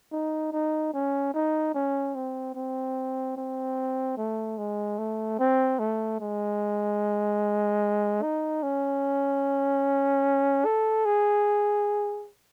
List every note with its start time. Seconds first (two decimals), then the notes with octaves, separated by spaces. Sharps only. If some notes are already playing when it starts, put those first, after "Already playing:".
0.12 D#4
0.52 D#4
0.93 C#4
1.34 D#4
1.74 C#4
2.15 C4
2.55 C4
3.37 C4
4.17 A3
4.58 G#3
4.98 A3
5.39 C4
5.79 A3
6.20 G#3
8.22 D#4
8.63 C#4
10.65 A4
11.05 G#4